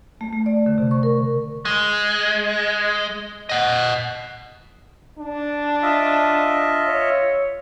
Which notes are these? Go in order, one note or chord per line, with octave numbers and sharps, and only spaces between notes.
A3
A3
D5
D3
C3
C#6
A#4
G#3
D#5 F#5
D4
F4 D#5 E5
C#5